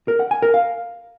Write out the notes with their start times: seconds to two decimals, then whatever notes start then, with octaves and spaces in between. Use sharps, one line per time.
0.08 A#4
0.20 F#5
0.31 G#5
0.42 A#4
0.54 F5